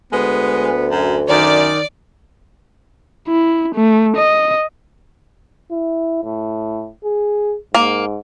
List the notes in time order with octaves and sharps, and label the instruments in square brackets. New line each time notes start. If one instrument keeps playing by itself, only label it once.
[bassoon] D2 [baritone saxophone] G#3 [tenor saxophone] B3
[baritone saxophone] F#2
[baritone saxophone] F#2 [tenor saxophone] D#3 [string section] D5
[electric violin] E4
A3
D#5
[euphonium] E4
A2
G#4
[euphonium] G#2 [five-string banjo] A#3